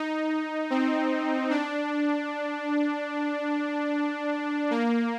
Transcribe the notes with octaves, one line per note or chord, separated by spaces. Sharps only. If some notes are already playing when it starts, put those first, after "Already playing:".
Already playing: D#4
C4
D4
A#3